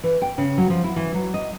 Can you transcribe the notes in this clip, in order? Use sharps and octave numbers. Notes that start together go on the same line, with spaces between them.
E3
G5
C#3
F#3
F3
E4
E3
F#3
D#5